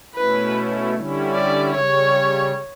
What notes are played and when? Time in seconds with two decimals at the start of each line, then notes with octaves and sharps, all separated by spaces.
0.15 B2 A3 C#4 E4 B4
0.94 D3 G3 C#4 E4
1.33 D5
1.73 C#3 G3 C#5